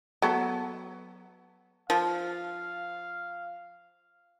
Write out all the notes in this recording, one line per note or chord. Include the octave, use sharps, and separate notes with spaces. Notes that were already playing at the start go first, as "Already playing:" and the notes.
F#3 B3 A4
F3 F5